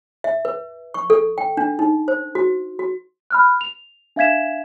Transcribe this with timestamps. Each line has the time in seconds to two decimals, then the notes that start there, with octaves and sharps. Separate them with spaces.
0.24 E5
0.45 B4
0.94 C#6
1.10 A4
1.38 G5
1.57 D4
1.79 D#4
2.08 C5
2.35 F#4
2.79 F#4
3.31 B5 F6 F#6
3.61 F7
4.16 D4 E5 F5 G#6 B6 E7